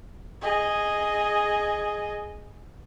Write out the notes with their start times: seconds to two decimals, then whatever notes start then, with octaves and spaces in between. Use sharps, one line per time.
0.42 G#4 D#5